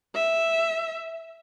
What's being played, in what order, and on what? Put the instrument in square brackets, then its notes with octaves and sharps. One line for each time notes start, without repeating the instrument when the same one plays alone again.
[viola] E5